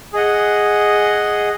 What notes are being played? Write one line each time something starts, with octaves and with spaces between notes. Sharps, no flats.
G#4 D#5 F#5